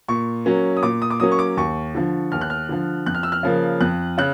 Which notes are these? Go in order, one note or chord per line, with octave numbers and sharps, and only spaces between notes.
A#2 C#6
F#3 A#3 C#4
D#6
A#2 D6
D#6
D6
F#3 A#3 C#4 D#6
C#6
D6
D#2 C#6
D3 F3
D#2 F6
F#6
F6
D3 F3
F2 F#6
F6
E6
F6
C#3 F3 A#3
F2 F#6
C#3 F#6